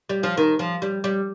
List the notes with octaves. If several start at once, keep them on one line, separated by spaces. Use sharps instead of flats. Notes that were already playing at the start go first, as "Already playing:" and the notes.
G3
F3
D#3
F3
G3
G3